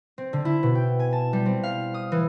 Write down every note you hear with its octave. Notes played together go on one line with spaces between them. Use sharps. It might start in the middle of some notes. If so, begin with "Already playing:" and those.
C4
D3
E4
B2
G5
G#5
A5
G3
C4
F5
D#6
E3